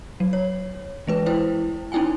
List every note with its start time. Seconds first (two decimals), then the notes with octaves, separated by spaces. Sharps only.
0.20 F#3
0.33 C#5
1.07 E3 G#3 B4
1.26 E4 C5 G5
1.92 C#4 D#4 E4 G5 G#5